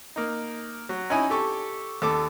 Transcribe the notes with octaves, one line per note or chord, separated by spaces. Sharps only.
A#3 D#4
F#3
C#4 D#4 E4 G#5
G4 A4 C#6
D#2 A4 D6